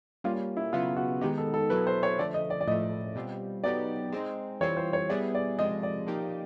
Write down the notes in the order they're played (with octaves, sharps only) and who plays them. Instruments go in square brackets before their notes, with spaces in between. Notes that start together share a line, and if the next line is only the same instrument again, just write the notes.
[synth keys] G3 A#3 C#4 [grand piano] F4
[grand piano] E4
[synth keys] C#3 F#3 B3 [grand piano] F4
[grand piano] F#4
[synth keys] D#3 G#3 B3 D#4 [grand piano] G4
[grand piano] A4
A4
[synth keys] B2 F#3 B3 E4 [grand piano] B4
[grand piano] C5
C#5
[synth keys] D3 F3 A3 [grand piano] D5
[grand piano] D#5
D5
D5
[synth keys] A2 F3 A3 [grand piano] D#5
[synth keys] B2 G3 C4 F4
[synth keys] F#3 B3 D#4 G4 [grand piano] D5
[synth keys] G#3 C4 D#4
[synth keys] E3 G3 C4 F4 [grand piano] C#5
[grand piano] C5
C#5
[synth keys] G3 B3 E4 G#4 [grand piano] D5
[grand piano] D5
[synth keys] C3 F3 G#3 [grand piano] D#5
[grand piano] D5
[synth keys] F3 A#3 D#4 G4